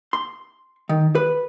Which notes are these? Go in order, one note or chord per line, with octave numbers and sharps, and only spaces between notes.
C6
D#3
B4